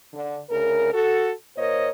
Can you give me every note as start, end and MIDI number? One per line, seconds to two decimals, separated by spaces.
0.13 0.39 50
0.49 0.89 38
0.49 0.89 49
0.49 0.89 70
0.92 1.31 66
0.92 1.31 69
1.57 1.88 46
1.57 1.88 70
1.57 1.88 72
1.57 1.88 73
1.57 1.88 75